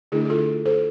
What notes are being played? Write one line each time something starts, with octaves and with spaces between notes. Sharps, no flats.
D3 A3 D4 E4 G#4
G#4
F4 A4
A4 C5